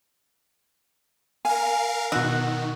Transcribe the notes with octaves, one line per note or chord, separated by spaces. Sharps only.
A#4 F5 G#5
B2 D#3 F#4 F#5 E6